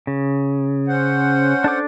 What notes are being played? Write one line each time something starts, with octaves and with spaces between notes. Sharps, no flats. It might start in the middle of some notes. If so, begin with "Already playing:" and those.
C#3
C#4 C5 F#5
D4 A4 D6